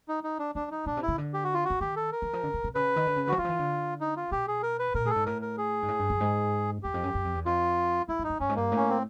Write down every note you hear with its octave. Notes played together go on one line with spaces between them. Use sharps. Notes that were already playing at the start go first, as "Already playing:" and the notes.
D#4
D#4
D4
C4 D4
F#3
C3 D#4
B2 D4
C3
E4
C#3
D3
G4
F#4
F4
F#4
D3
D#3 G4
A4
A#4
E3
F3
D3
C3
C3
C#3 B4
D#3
D3
C#3
D3 F3 F#4
E3 F4
F3
E3
D3
D#4
F4
B2 G4
G#4
A#4
B4
A#2 A#4
A2 G#4
A4
G#2
A2 A#4
A#4
G#4
G#2
A2
G2
F#2
G#2
E2 G4
F2
F#2
F#2
F2
E2
F2 F4
F#2 E4
F#2
D#4
G2
G2 C#4
G#2
G2 A#3
A2 C#4
C4